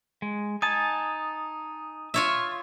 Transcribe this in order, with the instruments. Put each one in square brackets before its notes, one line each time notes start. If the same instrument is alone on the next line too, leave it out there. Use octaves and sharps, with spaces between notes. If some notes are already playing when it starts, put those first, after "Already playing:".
[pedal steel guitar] G#3
[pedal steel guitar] D#4 G#5 A5 [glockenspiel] D#6
[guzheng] F4 C#5 E5